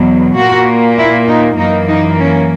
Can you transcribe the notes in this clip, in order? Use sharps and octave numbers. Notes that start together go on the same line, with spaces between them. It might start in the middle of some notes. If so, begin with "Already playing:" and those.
Already playing: E2 B2 F#3
A#2 A#3 F#4
E4
D#4
F#2 E3 A#3 D#4
D#4
C#4